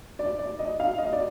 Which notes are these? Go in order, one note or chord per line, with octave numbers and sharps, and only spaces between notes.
D5
D5
D#5
F5
D#5
D5